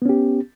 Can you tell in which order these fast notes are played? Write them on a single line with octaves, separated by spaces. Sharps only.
B3 C#4 G4